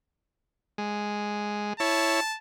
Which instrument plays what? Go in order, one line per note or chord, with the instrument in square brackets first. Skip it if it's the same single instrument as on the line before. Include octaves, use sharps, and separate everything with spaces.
[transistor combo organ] G#3
[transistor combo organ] E4 C#5 [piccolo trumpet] A5